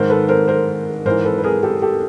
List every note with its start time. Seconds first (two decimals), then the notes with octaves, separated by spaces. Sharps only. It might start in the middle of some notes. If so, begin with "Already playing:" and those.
Already playing: G#2 D#3 A#4 C5
0.10 A4 B4
0.29 A#4 C5
0.48 A#4 C5
1.05 G#2 E3 A#4 C5
1.25 A4 B4
1.38 B4
1.44 G#4 A#4
1.63 G4 A4
1.82 G4 A4